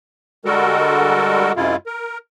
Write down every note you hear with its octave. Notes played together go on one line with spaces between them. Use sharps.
D3 G3 G#3 F#4 A4 A#4
F#2 C3 G#3 E4 F4
A#4